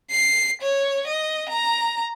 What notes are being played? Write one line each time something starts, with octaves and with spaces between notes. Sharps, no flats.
C7
C#5
D#5
A#5